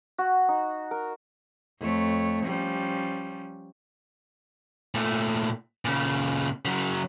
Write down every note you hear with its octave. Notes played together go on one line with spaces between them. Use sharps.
F#4
D#4
A#4
F2 A3 C#5
F3 G3 C#4
A#2 A3
A#2 C#3
C#3 F#3